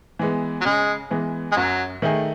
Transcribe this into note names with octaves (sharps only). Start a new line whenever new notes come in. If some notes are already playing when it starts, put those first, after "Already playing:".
E3 G#3 B3
F#3
C#3 G#3
E3 G#3 B3
G#3
F#2 F#3
D#3 A3 D#4 G#4